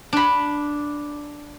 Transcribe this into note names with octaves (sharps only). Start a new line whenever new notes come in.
D4 B5